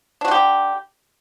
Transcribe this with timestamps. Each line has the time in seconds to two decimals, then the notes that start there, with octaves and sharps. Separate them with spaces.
0.21 D4
0.25 F#4
0.28 D3
0.31 G4